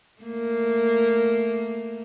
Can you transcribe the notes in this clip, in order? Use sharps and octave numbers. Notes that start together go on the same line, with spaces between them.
A3 A#3